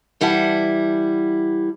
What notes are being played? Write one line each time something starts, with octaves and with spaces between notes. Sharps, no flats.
E3 G3 E4 F#5 A5